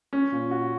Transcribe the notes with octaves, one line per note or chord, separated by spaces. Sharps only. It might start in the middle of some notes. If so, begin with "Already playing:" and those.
C#4
A#2
F#4